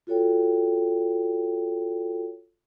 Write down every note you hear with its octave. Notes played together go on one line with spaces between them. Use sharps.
F4 F#4 A4 C#5 G5